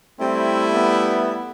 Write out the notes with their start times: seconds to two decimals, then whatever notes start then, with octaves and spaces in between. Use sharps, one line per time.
0.20 G3 A3 C4 E4
0.73 B3